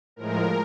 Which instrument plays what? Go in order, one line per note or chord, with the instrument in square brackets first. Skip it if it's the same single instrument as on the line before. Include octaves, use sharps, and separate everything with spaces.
[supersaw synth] A2 F3 G#3 A#4